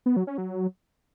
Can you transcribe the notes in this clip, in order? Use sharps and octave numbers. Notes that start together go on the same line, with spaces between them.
B3
F#3
C#4
F#3